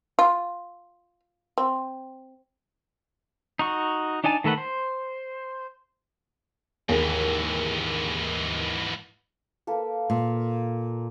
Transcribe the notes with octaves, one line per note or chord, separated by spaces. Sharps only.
F4
C4
D#4 F#4 C#6
D4 D#4 D5 G#5 A5
D#3 A3 A4 B4 F#5
C5
D#2 G#2 E3 G#4
A#3 A4 B4
A#2